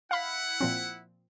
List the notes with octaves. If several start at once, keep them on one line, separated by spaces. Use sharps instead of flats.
E4 F5 F#5 B5
A#2 F3 C4